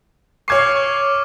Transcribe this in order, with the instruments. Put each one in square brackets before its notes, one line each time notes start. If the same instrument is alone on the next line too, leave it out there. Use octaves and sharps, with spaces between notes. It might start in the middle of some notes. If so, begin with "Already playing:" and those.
[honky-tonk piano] C#5 G#6 C7 [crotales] C#6 D6 F6